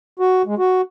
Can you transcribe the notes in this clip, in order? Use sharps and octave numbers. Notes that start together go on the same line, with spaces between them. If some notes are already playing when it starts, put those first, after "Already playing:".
F#4
G#3
F#4